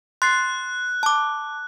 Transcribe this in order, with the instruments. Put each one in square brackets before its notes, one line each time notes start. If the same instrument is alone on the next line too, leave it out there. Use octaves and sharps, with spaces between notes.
[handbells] C6 A6 C7 [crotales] F#6
[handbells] A5 D6